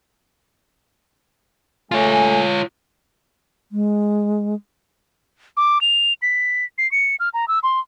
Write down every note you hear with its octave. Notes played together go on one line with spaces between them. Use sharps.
A3 F4 C#5 G#5
G#3
D6
F7
B6
C7
C#7
F6
A#5
E6
C6